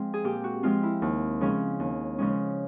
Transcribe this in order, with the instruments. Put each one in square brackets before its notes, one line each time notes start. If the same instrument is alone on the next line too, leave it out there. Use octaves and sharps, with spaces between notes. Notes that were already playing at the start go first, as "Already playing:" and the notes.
Already playing: [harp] F3 G#3 C4
G#4
A#2 G4
F#4
F3 G#3 C4 F4
E4
D#2
C#3 F3 G#3 C#4
D#2
C#3 F3 G#3 C#4